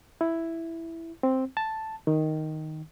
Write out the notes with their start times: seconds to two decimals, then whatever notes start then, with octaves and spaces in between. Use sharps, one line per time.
0.21 E4
1.23 C4
1.57 A5
2.07 D#3